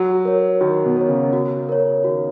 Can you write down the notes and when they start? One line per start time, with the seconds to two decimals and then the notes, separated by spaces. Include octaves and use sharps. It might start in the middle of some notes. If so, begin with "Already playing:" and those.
Already playing: F#3 F#4
0.25 A#4 C#5
0.61 D#3 F#4
0.85 B2
0.97 A#4 C#5
1.08 C#3
1.33 F#4
1.69 A#4 C#5
2.04 D#3 F#4